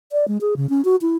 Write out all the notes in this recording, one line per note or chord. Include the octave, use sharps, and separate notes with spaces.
D5
G#3
G#4
C#3
C#4
F#4
E4